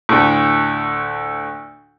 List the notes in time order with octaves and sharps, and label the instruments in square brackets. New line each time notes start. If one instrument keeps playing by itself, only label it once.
[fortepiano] D2 A2